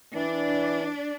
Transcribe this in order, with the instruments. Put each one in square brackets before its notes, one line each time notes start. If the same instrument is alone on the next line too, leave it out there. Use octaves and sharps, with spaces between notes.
[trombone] E3 [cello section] D4